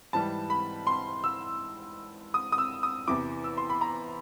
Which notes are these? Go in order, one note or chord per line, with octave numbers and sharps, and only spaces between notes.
G#2 E3 G3 A5
B5
C6
E6
D#6
D#6
E6
D#6
E2 C3 E3 D6
E6
C6
B5
A#5